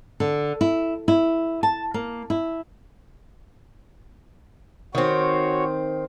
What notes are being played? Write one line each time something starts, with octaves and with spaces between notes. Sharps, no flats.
D3
E4
E4
A5
A#3
E4
D#3 C4 F#4 C#5